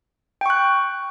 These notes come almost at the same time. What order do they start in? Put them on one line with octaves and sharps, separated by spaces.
G5 C#6 F#6